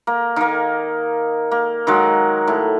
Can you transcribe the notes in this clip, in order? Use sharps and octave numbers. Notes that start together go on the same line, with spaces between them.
A#3
D#3 A#3
A#3
D#3 F#3 G#3
A2